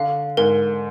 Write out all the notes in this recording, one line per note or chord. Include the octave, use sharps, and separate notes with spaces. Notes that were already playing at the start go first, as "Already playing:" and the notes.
Already playing: D3 F5
G#2 A#4